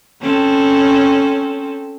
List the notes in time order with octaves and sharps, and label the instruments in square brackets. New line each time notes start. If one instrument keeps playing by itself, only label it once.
[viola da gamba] C4 C#4 A4